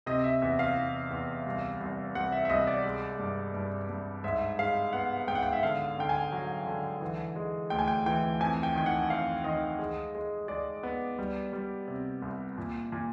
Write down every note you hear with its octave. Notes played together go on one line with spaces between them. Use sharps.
C3 D#5
E5
E2 E5
F5
E2
E2
C2
C2
C2 F#5
E5
E5
C2 D#5
D5
G#3
G2
G2
G2
G#2 E5
G#3 F5
B3 F#5
G#2 G5
F#5
G5
E5
D3 F5
D3 G5
G#5
F#3
D3
E3
G#3
D2 G5
G#5
G5
E3 G5
F2 G#5
G5
D#3 G5
F#5
F2 F5
D#3 D#5
G#3
G#3
G#3 D5
B3
G3
G3
C3
C2
A#2
A#2